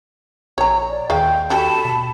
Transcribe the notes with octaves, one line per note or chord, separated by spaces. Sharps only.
A#1 C#5 A#5
D5
D#2 G#3 F5 G5
F#4 G4 A4 A5 B5
B2